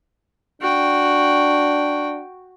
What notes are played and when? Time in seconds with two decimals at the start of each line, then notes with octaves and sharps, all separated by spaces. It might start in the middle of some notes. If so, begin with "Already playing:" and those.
0.62 D4 F#4 G5